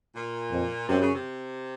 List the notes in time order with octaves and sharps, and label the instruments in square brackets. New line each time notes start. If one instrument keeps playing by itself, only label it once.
[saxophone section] A#2
[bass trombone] F2
[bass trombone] F#2 [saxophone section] C3
[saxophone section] C#3
C3